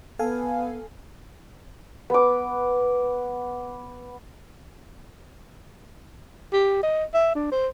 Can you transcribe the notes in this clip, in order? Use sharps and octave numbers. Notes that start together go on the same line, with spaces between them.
B3 A4 F5 G#5
B3 D6
G4
D#5
E5
D4
C5